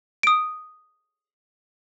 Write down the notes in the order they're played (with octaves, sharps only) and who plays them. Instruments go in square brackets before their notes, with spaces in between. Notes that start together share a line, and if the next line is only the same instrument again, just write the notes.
[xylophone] D#6 D7